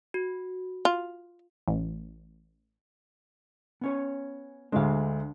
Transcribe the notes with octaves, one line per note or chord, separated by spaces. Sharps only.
F#4
F4
A1
B3 C#4 C#5
D2 D3 G#3 D4 F5